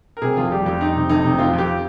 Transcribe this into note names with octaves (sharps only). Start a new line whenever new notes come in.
A#4
C3 G#4
F1 F4
G3 G4
F2 G4
F2 D#4
C3
F1 D#4
C3
F2 F4
F2
G4